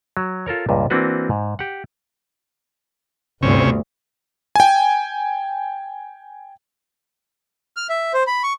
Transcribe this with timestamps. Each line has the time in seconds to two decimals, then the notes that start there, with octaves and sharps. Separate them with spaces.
0.17 F#3
0.46 F4 A4 A#4 C#5
0.69 C#2 G2 A#2
0.90 E3 A#3 C4 D4 F#4 B4
1.30 G#2
1.59 G4 F#5
3.42 G1 D2 C3 C#4
4.55 G5 G#5
7.77 F6
7.89 E5
8.14 C5
8.27 B5
8.43 C#6